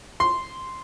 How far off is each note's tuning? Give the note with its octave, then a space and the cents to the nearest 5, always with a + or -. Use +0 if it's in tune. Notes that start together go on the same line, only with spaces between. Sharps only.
C6 -5